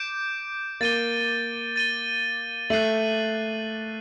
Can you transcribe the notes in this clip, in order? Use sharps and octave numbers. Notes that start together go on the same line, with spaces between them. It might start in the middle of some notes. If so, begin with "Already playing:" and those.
Already playing: D6 G6 D7
A#3 A6 D#7 G7
A6 D#7 G7
A3 F#6 C7 D#7 F#7